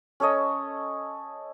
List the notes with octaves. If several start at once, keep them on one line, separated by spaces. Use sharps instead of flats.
C#4 A4 C#5 D#5